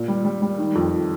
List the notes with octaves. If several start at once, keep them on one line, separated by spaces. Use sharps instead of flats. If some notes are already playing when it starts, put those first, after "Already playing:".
Already playing: A#2
G3
G3
G3
D#3
F2